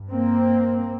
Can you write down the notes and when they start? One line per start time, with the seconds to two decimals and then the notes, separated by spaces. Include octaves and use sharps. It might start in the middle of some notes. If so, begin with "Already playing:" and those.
Already playing: G2
0.11 A#3 C4